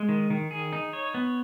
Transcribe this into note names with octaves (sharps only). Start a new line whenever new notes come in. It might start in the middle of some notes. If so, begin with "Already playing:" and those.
Already playing: G#3
D#3
D#3
G#4
D#4
C#5
B3